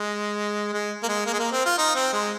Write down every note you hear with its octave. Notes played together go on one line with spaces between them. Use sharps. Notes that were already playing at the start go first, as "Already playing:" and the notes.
Already playing: G#3
G#3
A#3
G#3
A#3
G#3
A#3
C4
F4
D#4
C4
G#3